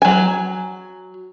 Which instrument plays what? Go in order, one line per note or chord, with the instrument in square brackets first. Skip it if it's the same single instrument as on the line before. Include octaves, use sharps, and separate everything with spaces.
[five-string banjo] F#3 G#5